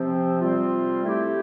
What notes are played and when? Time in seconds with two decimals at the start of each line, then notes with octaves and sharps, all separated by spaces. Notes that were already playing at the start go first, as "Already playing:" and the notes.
Already playing: C3 F3 C4
0.40 C3 G3 C4 F4
1.04 A3 E4 G4